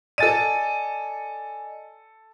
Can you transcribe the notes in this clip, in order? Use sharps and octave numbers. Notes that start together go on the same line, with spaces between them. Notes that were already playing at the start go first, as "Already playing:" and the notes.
A4 D5 D#5 G#5 A6 D#7